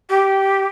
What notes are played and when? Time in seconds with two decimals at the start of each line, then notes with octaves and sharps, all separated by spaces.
0.09 G4